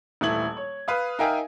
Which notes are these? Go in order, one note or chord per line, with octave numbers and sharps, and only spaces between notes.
D#1 E3 A3 G#6 F#7
C#5
B4 F5 D#6
D#4 A#4 E5 F5 G5 G#5